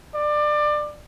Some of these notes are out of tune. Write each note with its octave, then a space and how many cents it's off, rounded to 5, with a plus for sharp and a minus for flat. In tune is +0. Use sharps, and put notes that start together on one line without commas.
D5 +25